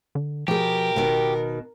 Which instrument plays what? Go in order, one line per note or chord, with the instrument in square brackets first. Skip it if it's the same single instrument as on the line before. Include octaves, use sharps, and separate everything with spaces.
[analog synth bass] D3
[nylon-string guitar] B2 G#4 [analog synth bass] F3 [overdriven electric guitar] G4 [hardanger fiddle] A#4
[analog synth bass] F#1 [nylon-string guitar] B2 D#3